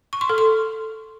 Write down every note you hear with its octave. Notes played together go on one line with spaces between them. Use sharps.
C#6
C6
A4
C6